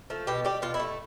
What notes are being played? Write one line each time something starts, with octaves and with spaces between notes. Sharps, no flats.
F3 A3
B2 G4
G3 G4
B2 F4
E4
A3